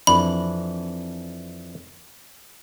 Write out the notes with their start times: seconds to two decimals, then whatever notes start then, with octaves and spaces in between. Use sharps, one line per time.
0.07 F2 E3 D4 B5